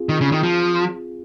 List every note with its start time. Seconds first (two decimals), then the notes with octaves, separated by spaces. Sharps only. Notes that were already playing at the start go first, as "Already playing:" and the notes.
Already playing: C4 F4 G#4
0.09 D#3
0.21 C#3
0.32 D#3
0.43 F3